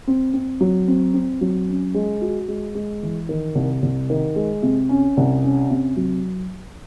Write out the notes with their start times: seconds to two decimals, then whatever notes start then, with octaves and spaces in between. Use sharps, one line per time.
0.07 C4
0.34 C4
0.61 F#3
0.88 C4
1.14 C4
1.41 F#3
1.69 C#4
1.94 G#3
2.21 F#4
2.48 G#3
2.75 G#3
3.03 E3
3.29 D#3
3.55 C2
3.82 C2
4.10 D#3
4.36 G#3
4.63 C3
4.89 C#4
5.17 C2
5.43 C#4
5.70 C3
5.97 F#3